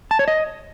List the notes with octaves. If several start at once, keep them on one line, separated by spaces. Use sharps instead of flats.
A5
C#5
D#5